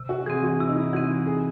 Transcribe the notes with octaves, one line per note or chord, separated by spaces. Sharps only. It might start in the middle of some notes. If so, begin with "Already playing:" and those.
Already playing: C3
F#4
E3 C4 G#4
F#4
C3 E4
D#4
E4
E3 C4 F#4
G#4